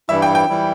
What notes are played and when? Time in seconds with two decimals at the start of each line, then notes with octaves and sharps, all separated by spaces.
0.09 G2 E3 G3 E4 E5
0.22 G5
0.35 G5
0.49 E3 G3 E4